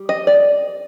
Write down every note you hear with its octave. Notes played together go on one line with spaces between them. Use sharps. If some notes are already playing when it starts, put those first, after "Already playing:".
Already playing: G3
D#5
D5